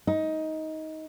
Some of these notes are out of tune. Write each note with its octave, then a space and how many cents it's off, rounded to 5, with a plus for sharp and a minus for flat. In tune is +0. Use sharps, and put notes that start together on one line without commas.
D#4 +15